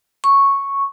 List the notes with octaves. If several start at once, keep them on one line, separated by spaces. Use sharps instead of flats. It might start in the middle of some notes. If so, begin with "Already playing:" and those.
C#6